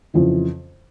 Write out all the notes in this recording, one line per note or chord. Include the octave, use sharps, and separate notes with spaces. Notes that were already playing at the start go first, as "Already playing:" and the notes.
F2 C#3 E3